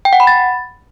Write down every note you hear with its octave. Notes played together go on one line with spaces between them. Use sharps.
G5
F#5
B5
A6